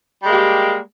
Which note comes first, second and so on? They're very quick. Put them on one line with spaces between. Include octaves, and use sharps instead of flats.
G3 G#3 A#3 G4